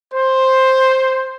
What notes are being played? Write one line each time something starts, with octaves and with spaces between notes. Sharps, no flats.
C5